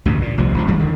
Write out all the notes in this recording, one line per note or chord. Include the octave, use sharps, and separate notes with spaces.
A1 D2 G2 B2
A#2
F1 C2 C3 F3
G#1 D2 A#2 F3
F2 E3 G3 G#3
D3 D#3